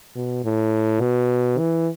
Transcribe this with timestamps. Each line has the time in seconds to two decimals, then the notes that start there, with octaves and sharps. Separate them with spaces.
0.15 B2
0.44 A2
1.00 B2
1.58 E3